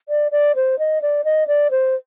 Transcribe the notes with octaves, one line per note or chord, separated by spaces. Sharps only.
D5
D5
C5
D#5
D5
D#5
D5
C5